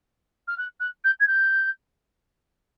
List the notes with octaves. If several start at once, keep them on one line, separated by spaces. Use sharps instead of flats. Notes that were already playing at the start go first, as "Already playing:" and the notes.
F6
F#6
F#6
G6
G#6
G6